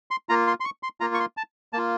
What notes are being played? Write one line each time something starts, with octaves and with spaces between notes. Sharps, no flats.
C6
A#3 F4 A#5
C6
C6
C#6
C6
A#3 F4 A#5
C#6
C6
A5
A#3 F4 A5